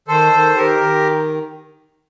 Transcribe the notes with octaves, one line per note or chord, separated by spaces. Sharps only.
D#3 A4 C5
D#3
D#3 G4 A#4
D#3